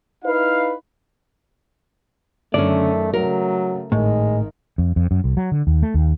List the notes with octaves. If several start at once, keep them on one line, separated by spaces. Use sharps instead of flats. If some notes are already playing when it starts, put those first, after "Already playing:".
D#4 E4 B4 F5
F#2 D3 D#3 A3 C#4 D5
C#3 F#3 A3 A#4
G#1 A2 D#3 G#3
F2
F2
F#2
C2
F#3
D3
D#2
A3
D#2